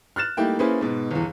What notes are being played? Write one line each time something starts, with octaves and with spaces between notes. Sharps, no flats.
F6 F#6 A6 E7
G3 A3 A#3 D#4 E4 G5
A#3 C#4 E4 G#4 B4 C5
G#2 B2
G1 E2